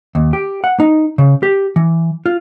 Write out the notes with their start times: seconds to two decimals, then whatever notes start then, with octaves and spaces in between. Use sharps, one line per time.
0.15 D#2
0.33 G4
0.64 F#5
0.80 D#4
1.18 C#3
1.43 G4
1.76 E3
2.26 F4